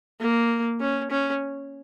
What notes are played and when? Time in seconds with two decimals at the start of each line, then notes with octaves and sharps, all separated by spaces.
0.20 A#3
0.81 C#4
1.11 C#4